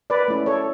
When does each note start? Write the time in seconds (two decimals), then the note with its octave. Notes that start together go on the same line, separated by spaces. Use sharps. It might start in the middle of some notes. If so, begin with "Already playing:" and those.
0.10 B4 D5
0.28 A3 C#4 E4
0.46 A4 C#5